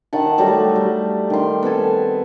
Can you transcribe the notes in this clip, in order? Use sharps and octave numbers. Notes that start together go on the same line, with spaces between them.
D#3 F#5 A5
F#3 G3 A3 F#4
G3
D#3 C6
B3 C4 A4 G#5